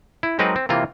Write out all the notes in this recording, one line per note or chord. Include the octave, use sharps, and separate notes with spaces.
E4
F#3 G#3 C4 D#4 A#4 B4
C4
C3 E3 A#3 F4